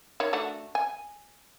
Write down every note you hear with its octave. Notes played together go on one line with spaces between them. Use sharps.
D#3 C#5
A3 D4 F#4
G#5